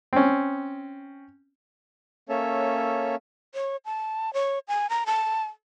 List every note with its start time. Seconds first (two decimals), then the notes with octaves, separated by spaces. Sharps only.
0.13 C4 C#4
2.29 A#3 C#4 A4 C#5 E5
3.53 C#5
3.85 A5
4.34 C#5
4.68 G#5
4.90 A#5
5.06 A5